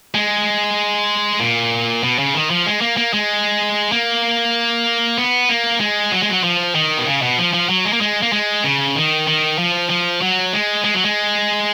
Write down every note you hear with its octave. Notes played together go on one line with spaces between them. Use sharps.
G#3
A#2
B2
C#3
D#3
F3
G#3
A#3
A#3
G#3
A#3
B3
A#3
G#3
F#3
G#3
F#3
F3
D#3
B2
C#3
B2
F3
F3
F#3
G#3
A#3
G#3
A#3
G#3
C#3
D#3
D#3
F3
F3
F#3
G#3
G#3
F#3
G#3